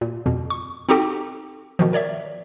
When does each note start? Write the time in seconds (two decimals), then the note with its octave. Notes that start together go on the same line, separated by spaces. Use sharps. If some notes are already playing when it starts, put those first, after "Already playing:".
0.01 A#2
0.26 F2 B2
0.50 C#6
0.89 C4 D#4 F#4 G4 A4 G5
1.79 B2 D#3 F3
1.93 A#4 C#5 D5 E5